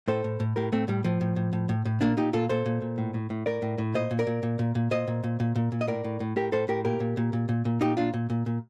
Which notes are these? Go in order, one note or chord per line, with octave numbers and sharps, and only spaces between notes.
A2 A4 C5
A2
A2
A2 G4 A#4
A2 A3 C4
A2 G3
A2 F3
A2
A2
A2
A2
A2
A#2 A#3 D4
A#2 D#4 G4
A#2 F4 A4
A#2 A4 C5
A#2
A#2
A2
A2
A2
A2 A#4 D5
A2
A2
A#2 C5 D#5
A#2
A#4 D5
A#2
A#2
A#2
A#2
A#2 C5 D#5
A#2
A#2
A#2
A#2
A#2
D#5
A2 A#4 D5
A2
A2
A2 G4 A#4
A2 A4 C5
A2 G4 A#4
A#2 G4 A#4
A#2
A#2
A#2
A#2
A#2
A#2 D#4 G4
A#2 D4 F4
A#2
A#2
A#2